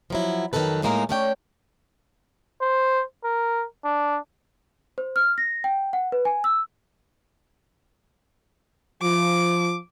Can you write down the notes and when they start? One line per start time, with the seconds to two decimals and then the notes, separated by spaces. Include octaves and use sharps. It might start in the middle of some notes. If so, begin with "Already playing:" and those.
0.10 F3 F#3 E4
0.53 F2 D#3 F#3 A#3 A4 B4
0.83 A2 G#3 A#3 D#4 E4 A#4
1.09 A3 C#4 C#5 D5 F#5 G5
2.62 C5
3.24 A#4
3.84 D4
4.98 C5
5.16 F6
5.38 A#6
5.64 G5
5.93 F#5
6.12 B4
6.25 G#5
6.44 E6
9.02 F3 D6